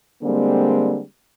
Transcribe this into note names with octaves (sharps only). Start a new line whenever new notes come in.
D3 G3 G#3 A#3 C4